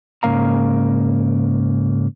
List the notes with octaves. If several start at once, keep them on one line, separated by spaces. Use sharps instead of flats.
G#2 C#3 A#3 F5 A#5